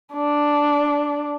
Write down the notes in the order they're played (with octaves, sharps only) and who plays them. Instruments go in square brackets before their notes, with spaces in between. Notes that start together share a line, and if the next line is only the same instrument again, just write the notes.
[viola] D4